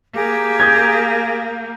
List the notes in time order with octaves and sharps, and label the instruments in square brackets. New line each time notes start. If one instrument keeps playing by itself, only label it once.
[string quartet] A#3 [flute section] G4 G#4
[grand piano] D#6 G6 G#6